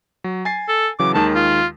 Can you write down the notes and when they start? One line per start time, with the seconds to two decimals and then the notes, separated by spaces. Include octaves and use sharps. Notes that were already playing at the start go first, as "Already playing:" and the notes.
0.24 F#3
0.45 G#5 A6 C7
0.68 A4
0.99 C#3 E3 F#3 D6
1.14 D#2 D#3 G#3 A5
1.35 F4